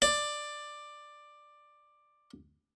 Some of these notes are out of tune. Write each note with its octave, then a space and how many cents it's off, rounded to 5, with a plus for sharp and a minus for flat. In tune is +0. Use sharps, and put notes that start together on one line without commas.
D5 +10